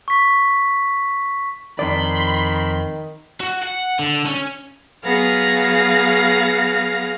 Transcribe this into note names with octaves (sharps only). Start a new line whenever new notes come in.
C#6 B6
F2 D#3 D5 B5 C6
F#4
F#5
D3
C#4
F#3 B3 G#4 F5 F6 A#6